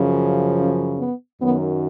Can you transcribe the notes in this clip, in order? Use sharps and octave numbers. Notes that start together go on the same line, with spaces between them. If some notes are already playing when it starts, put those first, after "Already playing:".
Already playing: F#2 C#3 F3
C#4
B3
F#2 D#3 F#3 B3